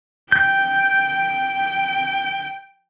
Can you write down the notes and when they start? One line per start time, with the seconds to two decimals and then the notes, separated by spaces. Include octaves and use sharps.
0.32 G5 G6